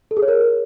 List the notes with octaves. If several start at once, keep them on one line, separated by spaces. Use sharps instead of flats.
A4
G#4
C#5
A#4